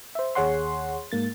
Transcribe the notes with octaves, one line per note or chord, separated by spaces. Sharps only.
C5 E5
D#2 G#4 C#5 F#5 C6
G#2 A#3 A6